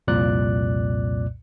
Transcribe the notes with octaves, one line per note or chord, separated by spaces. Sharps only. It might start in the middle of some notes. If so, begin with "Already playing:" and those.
C2 F2 A#2 D5 F#6